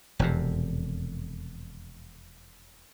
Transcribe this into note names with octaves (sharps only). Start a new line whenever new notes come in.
E1 F2 C3